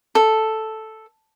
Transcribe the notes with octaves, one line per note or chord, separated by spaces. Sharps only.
A4